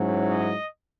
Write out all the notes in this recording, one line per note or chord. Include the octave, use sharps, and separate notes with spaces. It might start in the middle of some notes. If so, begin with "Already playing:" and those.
Already playing: G#2 F#3 C#4 E4
D#5